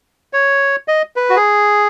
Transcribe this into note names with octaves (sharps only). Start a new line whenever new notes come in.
C#5
D#5
B4
F#4
G#4